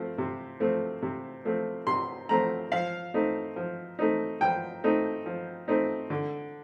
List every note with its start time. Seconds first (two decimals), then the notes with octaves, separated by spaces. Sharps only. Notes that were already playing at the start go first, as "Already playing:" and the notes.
Already playing: F3 A3 C4
0.18 C3
0.60 F3 A3 C4
1.02 C3
1.45 F3 A3 C4
1.87 C3 C6
2.29 F3 A3 C4 A#5
2.72 F3 F5
3.14 A3 C4 D#4
3.56 F3
3.99 A3 C4 D#4
4.41 F3 G5
4.84 A3 C4 D#4
5.26 F3
5.68 A3 C4 D#4
6.10 D3